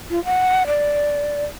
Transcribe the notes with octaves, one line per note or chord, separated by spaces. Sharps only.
F4
F#5
D5